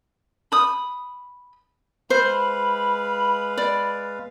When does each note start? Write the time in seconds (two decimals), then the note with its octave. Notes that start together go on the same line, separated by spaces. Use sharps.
0.52 B5 D#6
2.10 G#3 B4 C5 F5 B5
3.58 D5